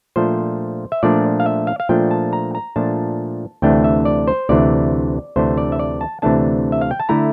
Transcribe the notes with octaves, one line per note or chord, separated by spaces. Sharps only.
A#2 F3 A3 D4 C5
E5
A#2 F3 A3 D4 D5
F5
E5
F5
F5
A#2 F3 A3 D4 G5
A5
A#5
A#5
A#2 F3 A3 D4 A5
D2 C3 E3 A3 D4 G5
E5
D5
C5
D2 C3 E3 A3 D4 D5
D2 C3 E3 A3 D4 C5
D5
E5
D5
A5
D2 C3 E3 A3 D4 A5
E5
F5
G5
A5
D3 A3 E4 A#5